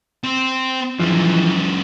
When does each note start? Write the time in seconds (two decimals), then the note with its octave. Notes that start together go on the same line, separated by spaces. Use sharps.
0.24 C4
0.99 F#2 E3 F3 G#3